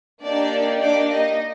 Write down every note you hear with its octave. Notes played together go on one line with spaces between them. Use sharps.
A#3 D4 D#4 G4 D5
D4 D5
D#4 D#5